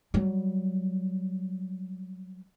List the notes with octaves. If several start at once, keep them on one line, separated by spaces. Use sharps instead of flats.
F#3 G3